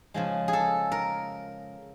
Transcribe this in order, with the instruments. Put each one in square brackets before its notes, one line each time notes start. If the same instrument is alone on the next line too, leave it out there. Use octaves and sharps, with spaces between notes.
[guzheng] C#3 F3 G#3
G#4
A4
A#4